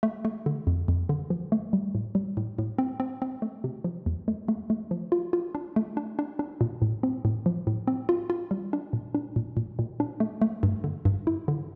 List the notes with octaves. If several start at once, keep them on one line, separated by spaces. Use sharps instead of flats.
A3
A3
D3
F2
F2
D3
F3
A3
G3
A2
G3
A2
A2
C4
C4
C4
A3
C3
F3
E2
A3
A3
A3
F3
F4
F4
D4
A3
D4
D4
D4
A#2
A2
C4
A2
F3
A2
C4
F4
F4
G3
D4
A#2
D4
A#2
A#2
A#2
D4
A3
A3
G2
D3
G2
E4
D3